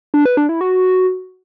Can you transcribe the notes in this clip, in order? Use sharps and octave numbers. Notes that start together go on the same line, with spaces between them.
D4
B4
D4
E4
F#4